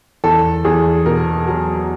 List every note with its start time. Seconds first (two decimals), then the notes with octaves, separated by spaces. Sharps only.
0.24 E2 A4
0.65 E2 G#4
1.06 B2 A#4
1.48 F#3